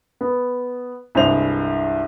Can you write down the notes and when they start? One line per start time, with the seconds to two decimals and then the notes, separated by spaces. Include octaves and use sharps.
0.21 B3
1.15 C2 G2 G#3 C5 F7